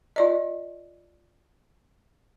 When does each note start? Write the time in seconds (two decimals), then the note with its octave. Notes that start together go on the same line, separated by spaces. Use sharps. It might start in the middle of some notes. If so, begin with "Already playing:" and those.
0.16 F4 D5 D#5